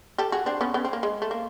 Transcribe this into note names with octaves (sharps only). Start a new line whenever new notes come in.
G4 A4
F#4 G#4
C4 D4
B3 C#4
B3 C#4
C4
A#3
G#3
A3
A#3